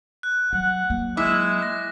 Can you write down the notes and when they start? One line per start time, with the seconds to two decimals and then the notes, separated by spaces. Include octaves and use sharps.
0.23 F#6
0.53 F#3 F#5
0.90 F#3 A#3
1.17 G#3 E4 D6 B6
1.62 A#6